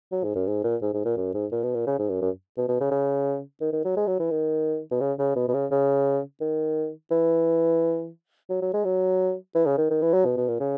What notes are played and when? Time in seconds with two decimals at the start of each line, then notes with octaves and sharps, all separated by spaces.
0.12 F#3
0.23 G#2
0.36 F#2
0.47 G#2
0.64 A#2
0.82 G#2
0.94 G#2
1.05 A#2
1.17 F#2
1.34 G#2
1.52 A#2
1.63 B2
1.74 A#2
1.87 C#3
1.99 G#2
2.10 F#2
2.22 F#2
2.57 B2
2.68 B2
2.80 C#3
2.91 C#3
3.61 D#3
3.73 D#3
3.85 F#3
3.97 G#3
4.07 F#3
4.20 E3
4.30 D#3
4.91 B2
5.01 C#3
5.19 C#3
5.36 B2
5.48 B2
5.54 C#3
5.71 C#3
6.41 D#3
7.11 E3
8.50 F#3
8.62 F#3
8.74 G#3
8.85 F#3
9.55 E3
9.66 C#3
9.78 D#3
9.90 D#3
10.02 E3
10.13 F#3
10.25 B2
10.37 B2
10.48 A#2
10.60 C#3